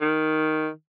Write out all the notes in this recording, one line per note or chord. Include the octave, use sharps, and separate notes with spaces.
D#3